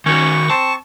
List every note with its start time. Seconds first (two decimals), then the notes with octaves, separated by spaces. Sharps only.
0.06 D#3 C#4 F#4 C#6
0.50 C4 A5